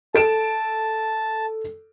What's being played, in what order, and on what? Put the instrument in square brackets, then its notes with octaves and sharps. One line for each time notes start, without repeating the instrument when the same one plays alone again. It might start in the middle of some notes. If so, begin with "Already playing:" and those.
[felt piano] A4 D7 E7 [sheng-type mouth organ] A5